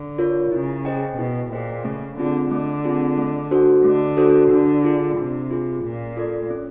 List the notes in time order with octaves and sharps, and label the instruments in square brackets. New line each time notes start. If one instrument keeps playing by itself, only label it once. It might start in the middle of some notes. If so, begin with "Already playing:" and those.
Already playing: [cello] D3
[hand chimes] F4 A#4 C#5
[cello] C#3 [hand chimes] E4
[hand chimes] G#4 C5 D#5 G5
[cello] B2 [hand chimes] E4
[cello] A#2 [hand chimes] G#4 C5 D#5 G5
[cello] C#3 [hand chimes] A3
[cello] D3 [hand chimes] C4 F4 G#4
[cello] D3 [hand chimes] A3
[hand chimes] C4 F4 G#4
A3
D4 F#4 A4 C5
[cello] D3 [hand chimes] A3
[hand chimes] D4 F#4 A4 C5
[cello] D3 [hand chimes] D4
[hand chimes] F4 G#4
[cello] C3 [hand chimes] D4
[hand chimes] F4 G#4
[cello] A#2 [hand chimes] C#4
[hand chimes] F4 A4 D5
C#4